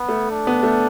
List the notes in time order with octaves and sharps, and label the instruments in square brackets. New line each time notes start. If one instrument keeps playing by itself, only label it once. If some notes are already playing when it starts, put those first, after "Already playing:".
Already playing: [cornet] B3
[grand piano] A3
[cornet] D4
[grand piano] B3
A3